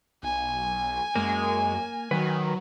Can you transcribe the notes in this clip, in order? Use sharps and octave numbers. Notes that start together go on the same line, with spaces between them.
B1 G#5
F#2 G#3 A#3
D#3 F#3 B4